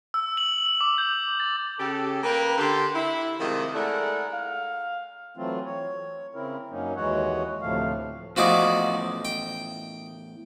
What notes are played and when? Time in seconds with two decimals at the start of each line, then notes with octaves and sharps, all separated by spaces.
0.14 E6
0.37 F#7
0.66 F#7
0.81 D6
0.98 G6
1.40 A6
1.79 C#3 G4 A4
2.23 A#3 B4 G5
2.58 D3 G4 C6
2.94 E4
3.39 C3 D#3 F3 G#3 A3
3.74 G#3 A3 D4 E4 A#4 F#5
4.33 F5
5.37 E3 F#3 A3 C4 F4
5.65 C#5
6.35 C#3 C4 E4 A#4
6.71 F#2 F#3 A#3 C#4 D#4
6.96 D#2 E3 G#3 F#4 C#5 F#5
7.62 D2 A2 C3 F3 A3 F5
8.36 E2 A2 F3 F#4 D5 D#5
9.25 G5